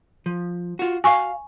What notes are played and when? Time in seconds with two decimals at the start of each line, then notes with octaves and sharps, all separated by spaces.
0.26 F3
0.79 F4 F#4
1.04 F#4 F5 G#5 C#6